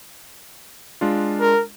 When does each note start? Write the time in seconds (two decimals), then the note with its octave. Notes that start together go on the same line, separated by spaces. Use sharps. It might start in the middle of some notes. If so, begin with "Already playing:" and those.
1.01 G#3 D4 F4
1.41 A#4